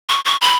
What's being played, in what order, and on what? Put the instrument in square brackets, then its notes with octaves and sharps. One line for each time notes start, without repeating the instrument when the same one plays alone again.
[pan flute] C#6
C#6
B5